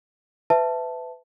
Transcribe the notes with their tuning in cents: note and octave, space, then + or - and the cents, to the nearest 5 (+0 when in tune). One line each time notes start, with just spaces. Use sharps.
B4 +30 E5 +0 A5 +0